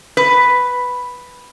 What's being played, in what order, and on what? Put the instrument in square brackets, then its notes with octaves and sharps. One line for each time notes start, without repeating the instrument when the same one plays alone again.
[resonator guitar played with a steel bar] B4